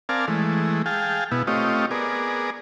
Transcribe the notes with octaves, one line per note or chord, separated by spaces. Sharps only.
C4 A#4 D5 F5 G#5 A5
E3 G#3 A3
G#4 F5 G5 A5
B2 B3 E4
A3 C4 F4 G4 C#5 D#5
B3 G#4 A#4 D5